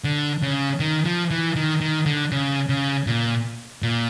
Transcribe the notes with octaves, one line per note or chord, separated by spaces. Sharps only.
D3
C#3
D#3
F3
E3
D#3
D#3
D3
C#3
C#3
A#2
A#2